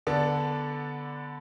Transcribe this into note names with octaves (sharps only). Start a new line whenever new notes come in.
D3 B3 D4 A4 D5